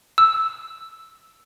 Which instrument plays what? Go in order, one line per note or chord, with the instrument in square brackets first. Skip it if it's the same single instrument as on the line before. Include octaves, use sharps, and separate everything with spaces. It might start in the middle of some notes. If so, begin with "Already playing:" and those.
[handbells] E6